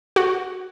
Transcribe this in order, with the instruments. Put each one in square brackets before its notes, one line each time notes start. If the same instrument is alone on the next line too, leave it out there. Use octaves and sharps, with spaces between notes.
[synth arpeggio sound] F#4